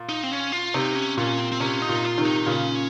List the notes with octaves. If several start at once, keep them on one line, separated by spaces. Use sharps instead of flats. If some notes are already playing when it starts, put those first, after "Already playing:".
Already playing: A#2
D#4
C4
C#4
F4
C3 D#4
C#4
A#2 C#4
C4
C4
C3 C#4
D#4
A#2
F4
C3 D#3
D#4
A#2 C#3 C#4